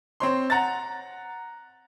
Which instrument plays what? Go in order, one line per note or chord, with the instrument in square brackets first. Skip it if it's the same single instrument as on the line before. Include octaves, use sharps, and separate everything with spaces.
[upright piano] C4 C#5 C6
F#5 A#5 F#6 A6